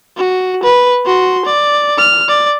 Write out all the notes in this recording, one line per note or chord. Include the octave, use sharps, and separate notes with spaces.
F#4
B4
F#4 C6
D5
F6
D5